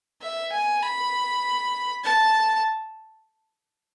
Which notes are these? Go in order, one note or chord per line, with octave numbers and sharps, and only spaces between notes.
E5
G#5
B5
A5